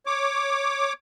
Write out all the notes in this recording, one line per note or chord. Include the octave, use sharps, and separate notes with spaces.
C#5 D6